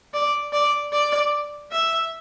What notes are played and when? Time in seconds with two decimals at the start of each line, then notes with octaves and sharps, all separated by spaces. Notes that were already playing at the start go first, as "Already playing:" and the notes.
0.14 D5
0.53 D5
0.92 D5
1.71 E5